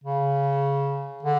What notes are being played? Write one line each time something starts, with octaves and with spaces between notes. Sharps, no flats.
C#3
D3